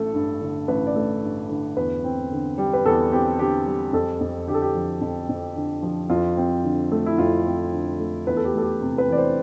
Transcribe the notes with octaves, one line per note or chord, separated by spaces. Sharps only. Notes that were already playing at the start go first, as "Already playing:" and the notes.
Already playing: A1 A3 A4
G2
D3
A1 B4
D5
A3
G2
D3
E2 B4
C4
D3
G3
B4
E2 A4
C4 G4
D3 G4
G3
F2 A4
F2
D3 G4
A4
G4
F3
F2
F2
D3
F3
F2 F4
C4
D3
A3
E4
F2 F4
C4
D3
A3
E2 B4
A4
G4
A3 A4
G4
C3
B4
E3 D5
C5